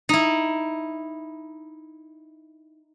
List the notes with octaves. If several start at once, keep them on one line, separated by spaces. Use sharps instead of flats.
D#4 E4